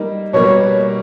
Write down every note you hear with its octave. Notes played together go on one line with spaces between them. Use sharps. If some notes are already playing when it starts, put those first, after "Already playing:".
Already playing: G3 A#3 D#4
B2 G3 A#3 C#5